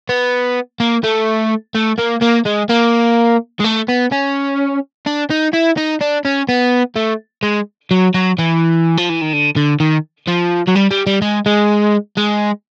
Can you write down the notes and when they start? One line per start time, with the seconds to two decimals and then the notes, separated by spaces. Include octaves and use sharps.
0.09 B3
0.80 A#3
1.04 A3
1.75 A3
1.99 A#3
2.22 A#3
2.46 G#3
2.70 A#3
3.60 G#3
3.64 A3
3.88 B3
4.12 C#4
5.06 D4
5.30 D#4
5.54 E4
5.77 D#4
6.01 D4
6.25 C#4
6.49 B3
6.96 A3
7.43 G#3
7.91 F#3
8.14 F#3
8.38 E3
8.97 F3
9.09 E3
9.21 D#3
9.33 D3
9.56 D3
9.80 D#3
10.27 F3
10.67 F#3
10.75 G3
10.91 G3
11.07 G3
11.22 G#3
11.46 G#3
12.17 G#3